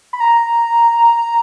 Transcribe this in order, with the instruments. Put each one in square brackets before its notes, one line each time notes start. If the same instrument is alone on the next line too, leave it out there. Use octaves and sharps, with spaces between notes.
[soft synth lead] B5
A#5